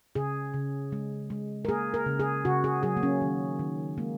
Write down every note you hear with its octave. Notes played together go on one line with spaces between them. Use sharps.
C#3 G#4
C#3
G#3
G#3
A#4
A#3 G#4
A#4
C#3
G#4
C#3 F#4
G#4
F#3 G#4
A#3
C#4
D#3
D#3
G#3 A#3